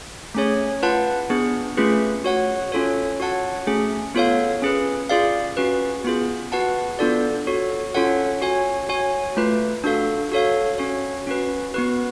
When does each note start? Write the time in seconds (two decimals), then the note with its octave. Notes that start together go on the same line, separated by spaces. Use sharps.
0.35 A3 C#4 G#4 C#5
0.83 F4 B4 F#5 A5
1.30 B3 D4 G#4
1.77 A3 C#4 F4 G#4 B4
2.24 F#4 C#5 F#5
2.72 C#4 F4 A4 C#5
3.20 F#4 C#5 F#5 A5
3.67 A3 C#4 G#4
4.14 B3 F4 A4 C#5 F5
4.62 C#4 G#4 B4
5.09 F4 G#4 D5 F5
5.57 C#4 F#4 B4
6.04 B3 F4 G#4
6.52 F#4 B4 F#5 A5
6.99 B3 D4 F4 A4 D5
7.47 F#4 A4 C#5
7.95 C#4 F4 A4 C#5 F#5
8.42 F#4 C#5 G#5
8.89 F#4 C#5 G#5
9.37 A3 F4 B4
9.84 D4 F#4 A4 F5
10.32 F#4 A4 C#5 F5
10.79 C#4 F#4 C#5
11.27 C#4 F#4 B4
11.74 B3 F#4 B4